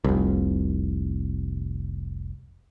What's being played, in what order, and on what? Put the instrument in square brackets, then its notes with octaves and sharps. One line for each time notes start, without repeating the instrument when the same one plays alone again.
[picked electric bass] F1 C2